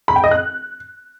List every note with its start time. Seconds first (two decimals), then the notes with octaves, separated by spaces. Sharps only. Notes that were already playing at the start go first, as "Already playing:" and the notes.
0.08 B5
0.16 G5
0.24 D#5
0.31 F#6